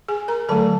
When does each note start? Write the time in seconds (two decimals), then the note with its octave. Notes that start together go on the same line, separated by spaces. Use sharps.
0.08 G#4 G#5
0.28 A#4 A#5
0.49 D3 F#3 A3 A4 A5